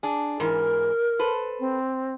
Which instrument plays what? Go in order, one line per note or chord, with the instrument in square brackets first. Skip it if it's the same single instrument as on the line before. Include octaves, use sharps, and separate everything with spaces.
[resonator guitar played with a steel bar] D4 G#4
[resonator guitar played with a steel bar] G#2 E3 [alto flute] A#4
[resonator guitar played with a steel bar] A4 B4 C5
[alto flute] C4